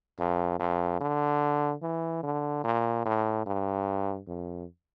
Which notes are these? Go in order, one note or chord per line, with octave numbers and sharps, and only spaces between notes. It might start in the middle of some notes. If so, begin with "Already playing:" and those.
F2
F2
D3
E3
D3
A#2
A2
G2
F2